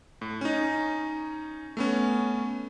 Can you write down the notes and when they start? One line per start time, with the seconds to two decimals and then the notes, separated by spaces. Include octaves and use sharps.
0.21 A2
0.41 C#4 D#4
1.77 A3 B3 C#4